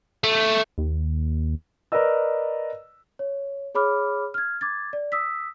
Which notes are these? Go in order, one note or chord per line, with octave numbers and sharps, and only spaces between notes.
A3
D#2
A#4 B4 D5 D#5 E6
C#5
G#4 C#5 B5 D6 F6
F6 G#6
D6 G#6 A6
D5
D#6 E6 B6